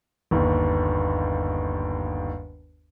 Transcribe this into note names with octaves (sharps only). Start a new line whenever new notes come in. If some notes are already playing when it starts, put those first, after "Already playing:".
G1 D#2